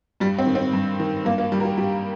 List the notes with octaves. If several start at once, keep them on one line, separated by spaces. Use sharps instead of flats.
G2 G3
C4
D#3
C4
G2
D#3
G2 A#3
A#3
D#3 G3
A#4
G4
G2 G4